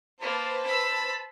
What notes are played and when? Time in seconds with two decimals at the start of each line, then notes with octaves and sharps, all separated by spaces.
0.21 A#3 B4 C5 A5
0.66 B5 E6